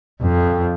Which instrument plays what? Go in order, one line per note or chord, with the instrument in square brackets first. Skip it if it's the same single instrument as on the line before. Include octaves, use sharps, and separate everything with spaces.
[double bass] F2